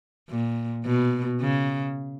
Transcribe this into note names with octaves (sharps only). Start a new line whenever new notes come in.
A#2
B2
C#3